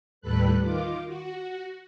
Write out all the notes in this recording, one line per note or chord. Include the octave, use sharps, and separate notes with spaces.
D#2 A2 G3 A4 B4 F#6
D#3 F4 D6
F#4